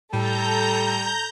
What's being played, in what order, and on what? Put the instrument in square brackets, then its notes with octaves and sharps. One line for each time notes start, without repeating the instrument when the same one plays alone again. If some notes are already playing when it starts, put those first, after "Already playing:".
[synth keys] A2 [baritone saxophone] G3 [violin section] A4 [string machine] A#5 G6